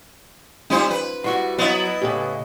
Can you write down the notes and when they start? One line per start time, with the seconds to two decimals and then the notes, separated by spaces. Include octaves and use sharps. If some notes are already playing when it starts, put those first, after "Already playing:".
0.70 G3 C#4 D#4 F4 C5
0.91 B4
1.24 G3 E4 F#4 F#5 C6 C#6
1.58 F#3 B3 E4 D#5
2.02 A2 C#3 G4 G#4